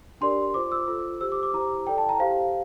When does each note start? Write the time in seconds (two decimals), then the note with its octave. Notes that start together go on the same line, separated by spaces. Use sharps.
0.21 D4 G4 A#4 D5 C6
0.54 F4 C5 D6
0.72 E6
0.87 F4 A4 C5
1.21 G4 C5 E6
1.32 D6
1.43 D6
1.54 E4 G4 C5 A#5
1.87 E4 A4 D5 G5
1.98 A5
2.09 A#5
2.19 G4 C5 F5